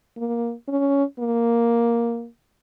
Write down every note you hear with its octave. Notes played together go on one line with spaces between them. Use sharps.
A#3
C#4
A#3